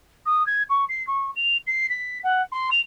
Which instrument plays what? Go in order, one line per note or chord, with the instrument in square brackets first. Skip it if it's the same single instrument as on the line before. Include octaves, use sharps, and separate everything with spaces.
[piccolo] D#6
G#6
C#6
C7
C#6
F7
C7
B6
F#5
C6
F7